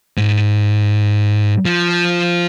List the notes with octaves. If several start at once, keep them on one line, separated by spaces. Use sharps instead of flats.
G#2
F3